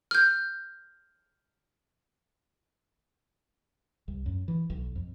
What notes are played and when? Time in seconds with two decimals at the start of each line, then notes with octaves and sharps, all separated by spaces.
0.11 F6 G6
4.08 C2
4.26 F#2
4.48 E3
4.70 B1
4.96 F2